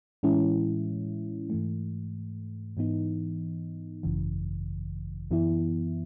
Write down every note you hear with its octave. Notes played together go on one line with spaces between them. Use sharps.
A2 E3 G#3 C#4 E4
G#2 E3 A3
G#2 E3 B3 D#4
G#1 F#2 C#3 E3
F#2 E3 B3 E4